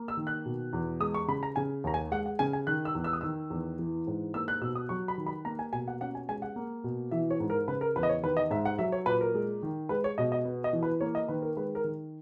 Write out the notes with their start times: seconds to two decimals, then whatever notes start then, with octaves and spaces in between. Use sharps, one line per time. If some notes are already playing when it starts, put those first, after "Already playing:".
Already playing: A#3
0.08 E6
0.17 D#3
0.27 F#6
0.46 B2
0.73 E2
1.00 G#3 D#6
1.14 C#6
1.28 C#3 B5
1.43 A#5
1.56 C#3 G#5
1.84 D#2 A#5
1.94 G#5
2.12 G#3 F#5
2.26 F#5
2.39 C#3 G#5
2.53 G#5
2.67 D#3 F#6
2.85 E6
2.95 E2
3.04 E6
3.13 D#6
3.21 D#3 E6
3.50 E2
3.79 E3
4.07 G#2
4.34 A#3 E6
4.48 F#6
4.61 B2 E6
4.75 D#6
4.89 F#3 C#6
5.08 B5
5.18 D#3
5.26 B5
5.45 A#3 A#5
5.59 G#5
5.73 B2 G#5
5.88 F#5
6.01 C#4 F#5
6.15 G#5
6.29 G#3 G#5
6.42 F#5
6.56 A#3
6.84 B2
7.11 E3 E5
7.31 C#5
7.40 G#2
7.50 A#4
7.68 C#3 B4
7.81 A#4
7.96 E2 B4
8.03 D#5
8.09 C#5
8.23 D#3 B4
8.37 D#5
8.50 G#2 E5
8.65 F#5
8.79 F#3 E5
8.92 C#5
9.06 A#2 B4
9.21 A#4
9.35 G#3
9.63 D#3
9.89 G#3 B4
10.04 C#5
10.18 B2 D#5
10.32 D#5
10.45 B3
10.64 D#5
10.73 E3
10.83 B4
11.01 A#3 C#5
11.15 D#5
11.28 D#3 B4
11.42 A#4
11.57 G#3 B4
11.75 A#4
11.84 D#3